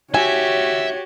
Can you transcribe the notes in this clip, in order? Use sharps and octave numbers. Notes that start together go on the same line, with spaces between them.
F#4 G4 C#5 E5 G#5